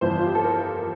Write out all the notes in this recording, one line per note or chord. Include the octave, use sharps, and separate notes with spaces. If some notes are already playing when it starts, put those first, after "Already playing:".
G1 F2 E3 C5
F4
G4
A4
A#4